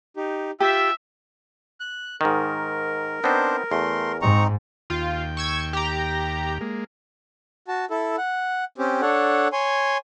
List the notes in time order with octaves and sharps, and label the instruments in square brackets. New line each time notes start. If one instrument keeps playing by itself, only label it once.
[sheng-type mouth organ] D#4 G4
[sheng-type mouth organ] F4 G5 [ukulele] G4 [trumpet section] E5
[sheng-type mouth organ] F#6
[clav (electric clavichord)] G#2 D#3 [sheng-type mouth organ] A#4
[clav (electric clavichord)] B3 C4 D#4 [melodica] D4 C5
[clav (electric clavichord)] E2 [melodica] A3 C6
[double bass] G#2 [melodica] C4 D#4 [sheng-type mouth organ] A#5 C#6
[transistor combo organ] D#2 G5 [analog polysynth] F4
[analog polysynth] C#6 E6 G#6
G4 A#5
[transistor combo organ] G#3 A#3
[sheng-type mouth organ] F#4 A5
E4 A4
F#5
C4 C#4 G4
D4 A4 C#5 F#5
C#5 G#5 C6